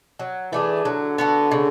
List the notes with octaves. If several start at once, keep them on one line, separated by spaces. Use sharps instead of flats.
F#3
E3 A3 D4 G#4
D3 F#3
B3 F#4 A4
C#3